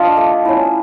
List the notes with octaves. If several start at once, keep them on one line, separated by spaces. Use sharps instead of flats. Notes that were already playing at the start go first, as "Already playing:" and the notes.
Already playing: D4 F4 D#5
A3
C#4 E4